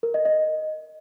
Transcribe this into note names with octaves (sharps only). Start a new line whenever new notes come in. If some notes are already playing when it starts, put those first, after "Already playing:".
A#4
D#5
D#5